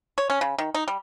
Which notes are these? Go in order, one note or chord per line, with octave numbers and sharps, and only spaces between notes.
C#5
C#4
C#3
D#3
D#4
G3